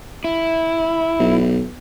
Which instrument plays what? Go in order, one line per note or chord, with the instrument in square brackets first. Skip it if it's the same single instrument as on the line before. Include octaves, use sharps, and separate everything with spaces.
[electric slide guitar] E4
[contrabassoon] B1